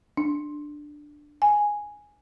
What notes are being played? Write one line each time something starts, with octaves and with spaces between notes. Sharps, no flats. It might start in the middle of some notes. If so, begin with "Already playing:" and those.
D4
G#5